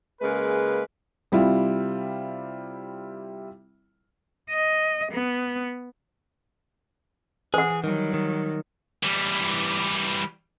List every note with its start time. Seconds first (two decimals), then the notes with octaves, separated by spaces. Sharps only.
0.21 C#3 G#3 A#3 B4
1.32 C3 G3 E4 F4
4.51 D#5
5.12 B3
7.54 E3 G#4 C5 F#5
7.84 D#3 F#3 G3
8.14 D#3
9.03 E3 G3